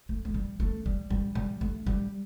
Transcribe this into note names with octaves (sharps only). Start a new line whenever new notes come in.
A3
A3
G3
A3
G3
G3
G3
A3
G3